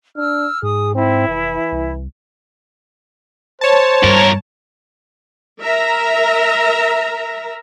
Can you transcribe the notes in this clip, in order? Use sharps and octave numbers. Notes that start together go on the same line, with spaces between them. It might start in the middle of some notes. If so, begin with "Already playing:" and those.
D4 E6 F6
G#2 G#4 D#6
C4 E4
F1 E3
C2
C5 C#5 A5
E2 G2 A#4
A#4 E5 A#5